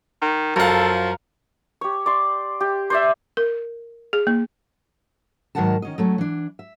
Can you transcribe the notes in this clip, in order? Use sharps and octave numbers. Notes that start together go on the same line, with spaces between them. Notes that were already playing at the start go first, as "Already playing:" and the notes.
D#3
F#2 F3 A4 F5 F#5 A#5
G4 C#5
D5 C6
G4
C5 D5 E5
A#4
G#4
A#3
G#2 D#3 F#3 A#4 F#5 A5
D#3 C#4 D#5
F#3 A3 C#4
E3 D4
E5